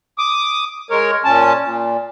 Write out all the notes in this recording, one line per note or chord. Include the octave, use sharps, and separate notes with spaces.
D6 D#6
G#3 A#4 C#5
A#2 C#4 A5
A#2